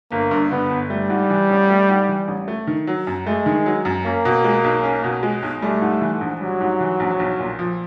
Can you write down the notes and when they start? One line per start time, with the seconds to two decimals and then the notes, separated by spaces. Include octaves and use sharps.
0.12 G1 A#3
0.31 G2
0.51 D3 B3
0.71 G1
0.90 G3 A3
1.10 G#2
1.30 E3
1.50 A1
1.69 A3
1.89 G#2
2.08 E3
2.28 A1
2.48 A3
2.67 D#3
2.87 F#3
3.07 F#2
3.27 G#3 A3
3.46 D#3
3.66 F#3
3.85 F#2
4.05 A#3 C#4
4.25 B2
4.44 G#3
4.64 B1
4.83 C#4
5.04 B2
5.23 G#3
5.43 B1
5.62 G3 A3
5.82 G#2
6.01 E3
6.21 A#1
6.40 F#3 G3
6.61 G#2
6.80 E3
7.00 A#1
7.19 B1
7.40 A#2
7.59 F3